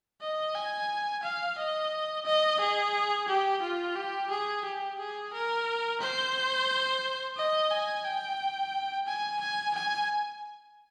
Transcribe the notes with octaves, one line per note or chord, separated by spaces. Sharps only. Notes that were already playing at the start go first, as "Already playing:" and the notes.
D#5
G#5
F5
D#5
D#5
G#4
G4
F4
G4
G#4
G4
G#4
A#4
C5
D#5
G#5
G5
G#5
G#5
G#5